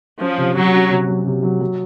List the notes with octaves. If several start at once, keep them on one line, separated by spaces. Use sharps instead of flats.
F3 C#4
C3
C3 F#3
C#4
C3
F#3
C3
F#3
F#3